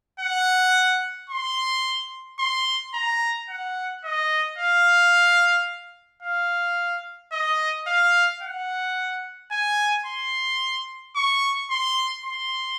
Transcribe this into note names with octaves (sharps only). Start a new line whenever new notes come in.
F#5
C6
C6
A#5
F#5
D#5
F5
F5
D#5
F5
F#5
G#5
C6
C#6
C6
C6